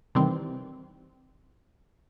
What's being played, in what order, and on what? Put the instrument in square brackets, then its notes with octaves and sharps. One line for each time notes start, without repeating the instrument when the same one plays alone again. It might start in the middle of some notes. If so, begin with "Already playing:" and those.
[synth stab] C3 D#3 E3 G3 C4